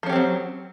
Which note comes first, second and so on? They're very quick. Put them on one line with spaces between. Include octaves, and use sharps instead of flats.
F3 C#4 G4 C4 F#3